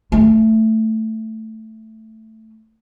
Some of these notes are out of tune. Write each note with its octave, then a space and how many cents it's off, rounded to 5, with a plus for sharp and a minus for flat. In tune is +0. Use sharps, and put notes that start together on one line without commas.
A3 +5